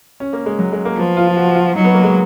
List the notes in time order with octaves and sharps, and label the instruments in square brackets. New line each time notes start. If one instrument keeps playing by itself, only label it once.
[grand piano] C#4
A#3
G#3
F#3
G#3
A#3
[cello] F3 [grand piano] B3
[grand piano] F4
F4
F#4
F#4
F4
[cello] F#3 [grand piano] D#4
[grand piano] B3
A#3
G#3